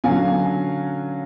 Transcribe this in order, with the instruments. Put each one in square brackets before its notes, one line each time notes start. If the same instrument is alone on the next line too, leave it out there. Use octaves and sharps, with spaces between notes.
[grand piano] D3 F#3 C#4 F5 G#5